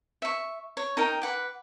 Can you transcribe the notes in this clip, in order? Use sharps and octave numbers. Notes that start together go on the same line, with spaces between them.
E5 C#6
C#5
D#4 A#4 G5
B4 F#5 D6